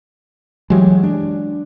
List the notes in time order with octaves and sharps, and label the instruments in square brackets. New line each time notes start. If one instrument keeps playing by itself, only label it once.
[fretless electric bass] E3 G#3 [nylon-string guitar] F#3 G4 C#5
[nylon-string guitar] D4